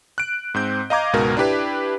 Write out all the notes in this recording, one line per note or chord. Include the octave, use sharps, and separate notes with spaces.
F#6 D7
G#2 C4 G6
D#5 F5 A#5 D6 G#6
C#2 G#2 B2 A#4 A#5
D4 E4 G4 B4